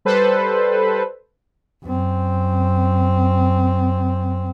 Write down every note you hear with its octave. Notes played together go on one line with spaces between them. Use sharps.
G3 A4 B4 C5
F#2 C4